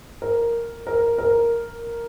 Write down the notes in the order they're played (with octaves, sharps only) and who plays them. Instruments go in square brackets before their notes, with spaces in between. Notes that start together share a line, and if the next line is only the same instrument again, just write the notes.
[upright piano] A#4
A#4
A#4